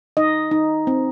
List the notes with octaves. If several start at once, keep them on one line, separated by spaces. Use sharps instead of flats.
D#4 D#5
D#4
C4